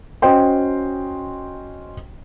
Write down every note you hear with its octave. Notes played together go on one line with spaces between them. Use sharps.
C#4 F#4 C5 D#5 G5 C6